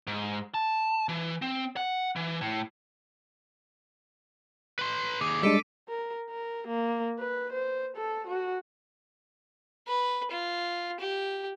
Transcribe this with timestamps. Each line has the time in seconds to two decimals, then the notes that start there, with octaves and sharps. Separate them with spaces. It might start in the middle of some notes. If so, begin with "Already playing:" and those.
0.07 G#2
0.54 A5
1.09 E3
1.42 C4
1.76 F#5
2.16 E3
2.41 A2
4.79 B4 C6
5.21 D#2 G#4 D6
5.43 G3 G#3 D4 A4 B6 D7 D#7
5.89 A#4
6.30 A#4
6.68 A#3
7.19 B4
7.53 C5
7.97 A4
8.27 F#4
9.87 B4
10.31 F4
11.00 G4